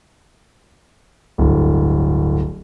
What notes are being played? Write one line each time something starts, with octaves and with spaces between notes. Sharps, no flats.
D1 G1